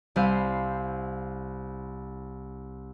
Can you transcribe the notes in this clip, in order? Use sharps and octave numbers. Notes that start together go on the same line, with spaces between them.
C2 E4 C5 F5 D#7